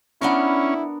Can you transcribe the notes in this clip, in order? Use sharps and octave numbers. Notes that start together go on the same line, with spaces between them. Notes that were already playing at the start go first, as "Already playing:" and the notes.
B3 C#4 D4 E4 A#4